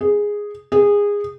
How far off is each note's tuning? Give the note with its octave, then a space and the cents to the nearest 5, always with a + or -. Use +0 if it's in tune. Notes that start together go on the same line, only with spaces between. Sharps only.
G#4 -5
G#4 -20